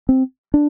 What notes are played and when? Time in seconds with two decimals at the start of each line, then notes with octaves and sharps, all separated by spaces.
0.09 C4
0.54 D4